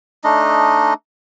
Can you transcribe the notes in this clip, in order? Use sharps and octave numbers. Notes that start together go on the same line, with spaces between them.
A3 D4 D#4 D#5